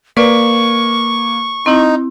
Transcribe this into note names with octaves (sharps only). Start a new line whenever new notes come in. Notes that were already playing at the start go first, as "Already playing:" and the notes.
A#3 B4 D5 C#6
C4 D#4 E4